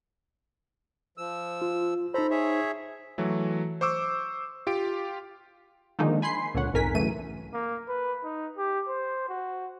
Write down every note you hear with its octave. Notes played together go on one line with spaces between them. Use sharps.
F3 E6
F4
D#4 A4 C5 A#5 B5
G#4 C#5 E5
E3 F#3 A3
C5 C#6 D6 E6
F4 G4 D7
D3 D#3 F3 G#3 A#3 D#4
G#5 B5 C6 C7
C#2 A#2 D3 C#5 F#5
B1 F2 G#2 A#4 G#5 B6
E2 C#3 E3 F#3 A3 D#7
A#3
B4
D#4
G4
C5
F#4